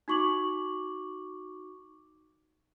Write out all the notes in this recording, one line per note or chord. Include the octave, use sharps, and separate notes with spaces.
D#4 F#4 C#6 D6 F#7